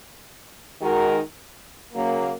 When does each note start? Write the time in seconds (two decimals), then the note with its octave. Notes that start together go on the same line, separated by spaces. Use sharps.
0.81 D#3 G#3 D#4 F#4 A#4
1.94 C#3 F#3 A#3